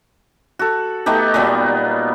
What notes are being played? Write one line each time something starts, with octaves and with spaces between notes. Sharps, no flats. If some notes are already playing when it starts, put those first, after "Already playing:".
F#4 A4
A3 B3 D#4 G4
A#2 F#3 G3 B3